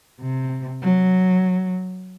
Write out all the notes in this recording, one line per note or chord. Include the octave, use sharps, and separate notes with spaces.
C3
F#3